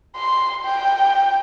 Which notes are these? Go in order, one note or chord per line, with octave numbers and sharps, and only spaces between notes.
C6
G5